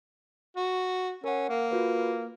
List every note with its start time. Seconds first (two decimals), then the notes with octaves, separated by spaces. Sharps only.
0.56 F#4
1.24 C#4 A#4 F#5
1.49 A#3
1.71 F4 F#4 B4